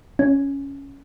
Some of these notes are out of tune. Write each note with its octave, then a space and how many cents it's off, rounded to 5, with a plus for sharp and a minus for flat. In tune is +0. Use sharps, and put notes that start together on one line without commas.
C#4 +0